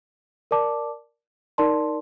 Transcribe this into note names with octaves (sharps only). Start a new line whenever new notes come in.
A#4 D5 A5 D6
D#4 A#4 D5 A5 C6